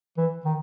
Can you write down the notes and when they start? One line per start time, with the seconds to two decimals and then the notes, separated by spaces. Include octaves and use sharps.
0.18 E3
0.45 D#3